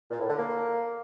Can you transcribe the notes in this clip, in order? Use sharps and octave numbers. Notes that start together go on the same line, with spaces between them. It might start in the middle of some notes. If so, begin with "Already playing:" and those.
A#2
A2
D3
A#3